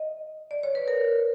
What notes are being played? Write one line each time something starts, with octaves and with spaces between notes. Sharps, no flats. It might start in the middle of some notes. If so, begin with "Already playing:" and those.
Already playing: D#5
D5
C#5
B4
A#4